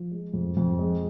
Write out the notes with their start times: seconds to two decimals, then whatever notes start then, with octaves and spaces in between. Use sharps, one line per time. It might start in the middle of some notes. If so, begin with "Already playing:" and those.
Already playing: F3
0.11 G#3
0.34 F2
0.57 F2
0.79 G#3